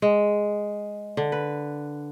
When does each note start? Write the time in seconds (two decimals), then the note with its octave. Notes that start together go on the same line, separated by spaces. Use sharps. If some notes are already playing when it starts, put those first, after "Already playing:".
0.02 G#3
1.17 D3
1.32 B4